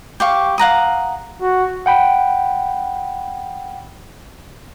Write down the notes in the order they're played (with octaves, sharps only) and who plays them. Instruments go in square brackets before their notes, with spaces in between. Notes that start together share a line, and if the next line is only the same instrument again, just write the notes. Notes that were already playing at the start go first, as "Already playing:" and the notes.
[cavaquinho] G4 F5 C#6
F5 F#5 A#5 D#6
[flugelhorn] F#4
[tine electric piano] F#5 G5 B5